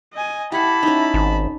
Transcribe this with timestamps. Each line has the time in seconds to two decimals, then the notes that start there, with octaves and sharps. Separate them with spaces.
0.13 D#5 G#5
0.52 E4 G4 F#5 A5 B5
0.83 C#4 D#4
1.14 G#1